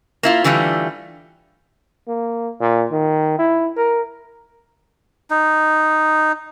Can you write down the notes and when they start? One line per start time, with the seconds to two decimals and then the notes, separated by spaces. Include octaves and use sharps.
0.23 A#3 E4 F4
0.44 D3 E3 G3 A3 F4
2.08 A#3
2.61 A#2
2.92 D#3
3.39 E4
3.77 A#4
5.30 D#4